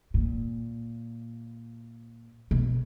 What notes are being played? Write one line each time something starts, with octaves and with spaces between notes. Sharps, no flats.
A#2
B2